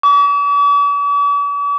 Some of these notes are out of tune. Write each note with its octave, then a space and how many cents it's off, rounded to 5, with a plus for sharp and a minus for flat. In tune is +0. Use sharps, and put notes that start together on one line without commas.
D6 -45